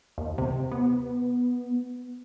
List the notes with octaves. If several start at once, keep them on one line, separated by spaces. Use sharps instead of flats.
D#2
C3
B3